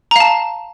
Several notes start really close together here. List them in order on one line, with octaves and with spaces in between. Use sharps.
A#5 F5 A5